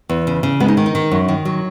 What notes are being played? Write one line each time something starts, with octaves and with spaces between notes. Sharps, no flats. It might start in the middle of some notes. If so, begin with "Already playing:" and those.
E2
C#3
C#3
G#3 B3
D#4
D#3
D#4
D#3
F#2
D#3
F#3